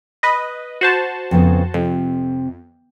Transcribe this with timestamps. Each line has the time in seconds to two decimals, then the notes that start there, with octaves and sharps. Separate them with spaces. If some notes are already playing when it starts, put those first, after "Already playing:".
0.23 B4 D#5
0.81 F#4 C5 A5
1.31 F2 C#3 B3
1.74 F2 C3